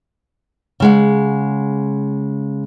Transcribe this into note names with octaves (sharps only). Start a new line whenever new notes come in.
C#3 G#3 F#5